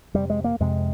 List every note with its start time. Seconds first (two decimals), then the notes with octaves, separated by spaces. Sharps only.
0.14 F2 C3 G3
0.30 G#3
0.44 A#3
0.60 F2 C3 G#3